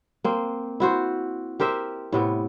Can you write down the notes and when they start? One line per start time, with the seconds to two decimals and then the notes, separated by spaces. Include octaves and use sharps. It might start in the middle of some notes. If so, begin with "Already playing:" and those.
0.24 A#3 C4
0.80 E4 F#4 C5
1.60 G4 A#4 C5 E5
2.12 A2 C3 B3